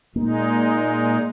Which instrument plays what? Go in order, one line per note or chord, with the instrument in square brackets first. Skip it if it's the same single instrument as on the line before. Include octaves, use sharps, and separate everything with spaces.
[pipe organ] A#2 G#3 D#4 [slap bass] A#3